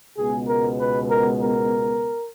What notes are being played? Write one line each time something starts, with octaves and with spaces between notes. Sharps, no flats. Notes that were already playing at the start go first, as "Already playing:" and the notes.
C#2 B2 G#3 B3 G#4
A#4
B4
A#4
A#4